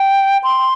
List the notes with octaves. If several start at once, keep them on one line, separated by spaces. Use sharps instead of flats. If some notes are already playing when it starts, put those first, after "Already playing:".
Already playing: G5
C6